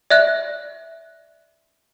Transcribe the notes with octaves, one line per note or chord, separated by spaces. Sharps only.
D5 E5 F#6